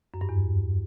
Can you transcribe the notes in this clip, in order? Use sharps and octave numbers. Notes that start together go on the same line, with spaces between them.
F#2
G2
E2